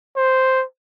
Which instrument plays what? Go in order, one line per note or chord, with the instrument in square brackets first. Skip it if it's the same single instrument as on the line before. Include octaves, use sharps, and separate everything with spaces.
[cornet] C5